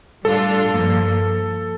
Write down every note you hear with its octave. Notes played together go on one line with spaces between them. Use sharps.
A2 G3 D4 F4 A4
G2 F3 A#3